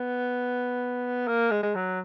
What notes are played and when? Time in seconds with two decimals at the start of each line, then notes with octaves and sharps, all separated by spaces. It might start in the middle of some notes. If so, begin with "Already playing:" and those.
Already playing: B3
1.28 A#3
1.51 G#3
1.63 G#3
1.75 F#3